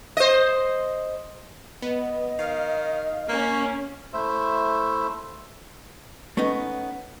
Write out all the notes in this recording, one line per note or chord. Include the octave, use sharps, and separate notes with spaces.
C5 D#5
B3 D#5
D#3 F5
A#3 C#4
A3 E4 C5 E5
A3 B3 C#4 D#4